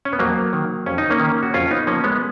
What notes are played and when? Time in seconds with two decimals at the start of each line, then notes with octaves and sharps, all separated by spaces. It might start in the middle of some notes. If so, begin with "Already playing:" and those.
0.05 C#4
0.13 B3
0.19 F2 F#3 A#3
0.53 D#3
0.86 F2 C#4
0.98 D#4
1.10 A#3 C#4
1.20 D#3
1.43 F#4
1.54 F2 C#4 F4
1.71 B3 D#4
1.87 F3 A#3 C#4
2.04 G#3 B3